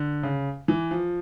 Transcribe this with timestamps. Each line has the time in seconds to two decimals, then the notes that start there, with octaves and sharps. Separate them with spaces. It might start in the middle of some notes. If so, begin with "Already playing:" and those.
Already playing: D3
0.23 C#3
0.68 E3
0.91 F3